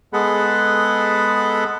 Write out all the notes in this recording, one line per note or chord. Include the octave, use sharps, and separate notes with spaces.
G#3 B3 G#4 A4 F#5 B5